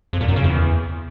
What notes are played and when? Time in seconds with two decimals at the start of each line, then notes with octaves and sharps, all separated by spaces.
0.13 F2
0.21 A#2
0.28 F#2
0.36 C#3
0.44 E2